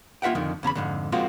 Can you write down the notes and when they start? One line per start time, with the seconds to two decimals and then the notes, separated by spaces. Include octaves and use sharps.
0.22 A#3 F4 E5 F#5 G5
0.35 F2 D3 D#3
0.63 E2 C#3 A#5 B5
0.75 F2 G#2 D3
1.12 F3 G#3 A#3 C4 F4 F#4